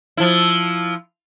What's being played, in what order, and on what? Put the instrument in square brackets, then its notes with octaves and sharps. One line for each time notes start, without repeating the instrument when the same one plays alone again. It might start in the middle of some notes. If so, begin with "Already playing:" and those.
[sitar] F3 E4